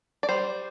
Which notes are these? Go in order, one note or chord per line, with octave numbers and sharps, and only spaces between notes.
D5
G3 C5